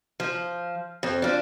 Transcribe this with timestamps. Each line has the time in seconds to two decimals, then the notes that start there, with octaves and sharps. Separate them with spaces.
0.20 F3
1.03 F2
1.22 F3 D4